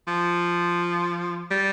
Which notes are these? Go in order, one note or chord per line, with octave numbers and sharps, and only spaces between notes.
F3
G3